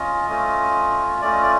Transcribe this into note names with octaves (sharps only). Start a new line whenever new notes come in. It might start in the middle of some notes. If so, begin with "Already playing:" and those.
Already playing: C#4 F4 D#5
A3 C#4 F4
A3 C#4 F4 D5
D#5
D5